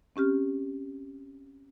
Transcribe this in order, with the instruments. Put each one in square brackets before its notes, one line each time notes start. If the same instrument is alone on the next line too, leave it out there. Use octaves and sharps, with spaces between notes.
[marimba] C4 C#4 G4 F6